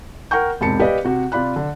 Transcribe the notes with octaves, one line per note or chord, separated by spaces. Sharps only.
A#4 F#5 G5 C#6 G6
E1 G#2 C3 A5 B5 C#7
G4 B4 D5 D#5 F5
C3 F#4
C3 F4 D5 B5 F#6
D3